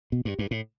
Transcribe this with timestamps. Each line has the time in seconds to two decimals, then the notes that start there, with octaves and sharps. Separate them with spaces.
0.12 B2
0.25 G2
0.39 G2
0.51 A2